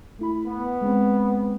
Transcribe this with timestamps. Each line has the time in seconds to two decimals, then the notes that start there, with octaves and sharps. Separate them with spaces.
0.19 A3 E4 B5
0.47 B3
0.81 G#3 C4